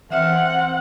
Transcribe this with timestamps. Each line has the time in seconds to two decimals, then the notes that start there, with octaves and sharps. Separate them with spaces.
0.10 E3 C4 E5 F#5 F6